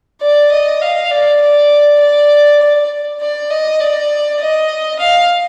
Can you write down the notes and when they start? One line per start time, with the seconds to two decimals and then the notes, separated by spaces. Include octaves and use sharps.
0.21 D5
0.51 D#5
0.82 F5
1.11 D5
1.41 D5
2.00 D5
2.60 D5
3.20 D5
3.50 D#5
3.80 D5
4.39 D#5
4.99 F5